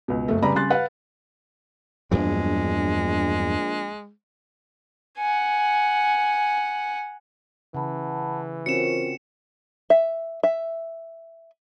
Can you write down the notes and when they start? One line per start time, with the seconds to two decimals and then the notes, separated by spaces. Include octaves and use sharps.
0.08 C#2 B2
0.28 F#1 A3
0.42 C#3 G3 B4 D5 A#5 B5
0.55 C#3 G3 G4 C6 F#6 A6
0.70 B4 F5 F#5
2.11 A#1 E2 G2 F#3 G#3
5.18 F#5 G#5
7.74 C#3 E3 F#5 A5 B5
8.66 C4 C#4 F4 F#4 A#4 C5 C#7 E7
9.90 E5
10.43 E5